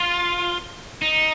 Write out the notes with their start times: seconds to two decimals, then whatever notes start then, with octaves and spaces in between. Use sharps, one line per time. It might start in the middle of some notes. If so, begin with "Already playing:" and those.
Already playing: F4
1.02 D#4